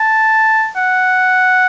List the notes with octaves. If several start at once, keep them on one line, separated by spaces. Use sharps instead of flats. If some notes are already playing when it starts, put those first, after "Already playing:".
Already playing: A5
F#5